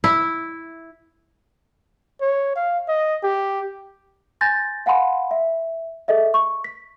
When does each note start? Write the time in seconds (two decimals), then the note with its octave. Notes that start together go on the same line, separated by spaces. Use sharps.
0.04 E4
2.21 C#5
2.56 F5
2.88 D#5
3.23 G4
4.41 G#5 C6 G6 A6 A#6
4.86 F5 F#5 G#5 B5 C6
5.31 E5
6.08 G#4 A4 D#5 E5
6.34 C#6
6.64 B6